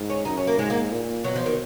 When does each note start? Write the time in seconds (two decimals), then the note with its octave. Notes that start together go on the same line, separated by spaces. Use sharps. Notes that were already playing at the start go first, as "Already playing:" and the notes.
Already playing: G#2
0.10 C#4
0.25 F#2 D#4
0.37 C#4
0.47 A#3
0.58 G#2 G#3
0.70 A#3
0.92 A#2
1.24 B2 F#3
1.36 F3
1.46 D#3